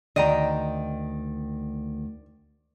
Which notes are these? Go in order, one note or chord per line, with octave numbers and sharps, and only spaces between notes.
D2 D#3 D5 D#5 G5 A#5